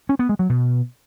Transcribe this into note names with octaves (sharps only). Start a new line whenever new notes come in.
C#4
B3
G#3
F#3
B2